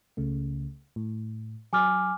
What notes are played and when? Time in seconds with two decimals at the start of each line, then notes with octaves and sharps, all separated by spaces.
0.17 C#2 C#3 A3
0.96 A2
1.73 F#3 G#5 D6 F6